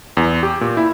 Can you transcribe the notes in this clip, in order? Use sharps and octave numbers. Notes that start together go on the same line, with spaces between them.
E2
G4
A#2
E4